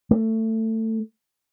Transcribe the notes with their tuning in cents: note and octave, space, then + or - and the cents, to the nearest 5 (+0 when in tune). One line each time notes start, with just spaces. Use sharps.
A3 +20